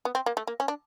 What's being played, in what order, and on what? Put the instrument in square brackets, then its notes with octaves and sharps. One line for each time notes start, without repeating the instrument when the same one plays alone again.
[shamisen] B3
C4
A#3
A3
A#3
C#4
D4